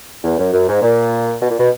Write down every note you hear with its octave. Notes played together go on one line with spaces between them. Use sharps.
E2
F#2
F#2
G#2
A#2
B2
A#2
B2